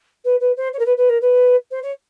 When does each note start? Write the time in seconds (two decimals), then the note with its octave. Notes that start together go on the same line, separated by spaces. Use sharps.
0.25 B4
0.41 B4
0.57 C5
0.74 C#5
0.79 A#4
0.86 B4
0.97 B4
1.09 A#4
1.22 B4
1.71 C5
1.83 C#5